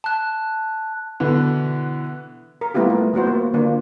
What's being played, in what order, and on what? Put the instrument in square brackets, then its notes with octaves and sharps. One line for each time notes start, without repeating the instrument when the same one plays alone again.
[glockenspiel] A5 F#6
[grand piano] B2 D3 E3 B3
[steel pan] A#4
G3 A3 B3 E4 F4 G4
A3
E3 B3 F#4 C5
A#3
D3 A#3 D4 F4